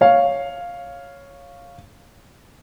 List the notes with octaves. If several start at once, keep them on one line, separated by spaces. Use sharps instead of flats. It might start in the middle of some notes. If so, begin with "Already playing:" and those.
C#5 F5